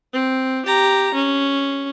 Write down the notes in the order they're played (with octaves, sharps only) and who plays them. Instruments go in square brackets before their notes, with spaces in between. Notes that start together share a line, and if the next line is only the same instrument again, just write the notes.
[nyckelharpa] C4
G4 A#5
C#4